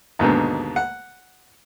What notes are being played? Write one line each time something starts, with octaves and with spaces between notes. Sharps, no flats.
D#2 G#2 B2 D3
F#5